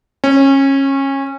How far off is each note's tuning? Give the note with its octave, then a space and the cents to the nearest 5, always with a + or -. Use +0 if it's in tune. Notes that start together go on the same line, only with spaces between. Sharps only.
C#4 -25